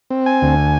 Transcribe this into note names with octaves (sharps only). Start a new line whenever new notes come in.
C4
G#5
D2